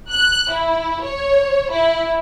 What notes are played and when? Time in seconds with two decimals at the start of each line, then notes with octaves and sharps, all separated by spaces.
0.11 F#6
0.51 E4
1.03 C#5
1.71 E4